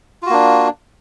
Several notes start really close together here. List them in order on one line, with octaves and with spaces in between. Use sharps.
F4 F#4 A#3 D4